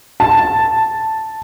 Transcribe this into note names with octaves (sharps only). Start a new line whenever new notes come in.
A5